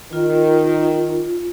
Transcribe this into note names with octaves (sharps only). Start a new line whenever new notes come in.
D#3 F4